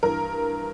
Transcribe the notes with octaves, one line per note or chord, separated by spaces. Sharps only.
G2 E3 A#4